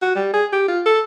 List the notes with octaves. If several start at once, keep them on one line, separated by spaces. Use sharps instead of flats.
F#4
G3
G#4
G4
F4
A4